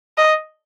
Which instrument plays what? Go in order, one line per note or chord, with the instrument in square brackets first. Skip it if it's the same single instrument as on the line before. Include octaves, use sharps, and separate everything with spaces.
[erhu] D#5